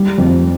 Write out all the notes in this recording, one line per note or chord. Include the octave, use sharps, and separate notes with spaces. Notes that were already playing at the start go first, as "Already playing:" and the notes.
Already playing: G3
F2